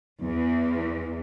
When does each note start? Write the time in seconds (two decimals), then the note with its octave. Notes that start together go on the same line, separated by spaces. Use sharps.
0.22 E2